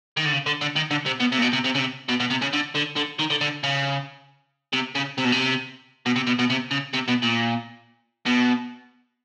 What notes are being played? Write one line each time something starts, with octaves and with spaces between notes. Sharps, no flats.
D#3
D3
C#3
D3
D3
D#3
D3
C3
B2
C3
A#2
B2
C3
C3
C#3
C3
B2
B2
C3
C#3
D3
D3
D3
D#3
D3
D3
C#3
C3
C#3
C3
B2
C3
B2
C3
B2
B2
C3
C#3
C3
B2
A#2
B2